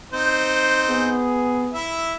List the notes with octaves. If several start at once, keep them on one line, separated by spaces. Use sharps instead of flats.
C4 D#4 C5
B3 G#4
E4 E5